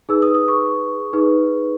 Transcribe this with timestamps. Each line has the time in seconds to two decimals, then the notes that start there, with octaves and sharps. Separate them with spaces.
0.09 D#4 G#4 B4 E6
0.22 D#6
0.34 D#6
0.48 C#6
1.13 D#4 G#4 B4